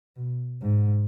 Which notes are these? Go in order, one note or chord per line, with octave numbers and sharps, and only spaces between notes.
B2
G#2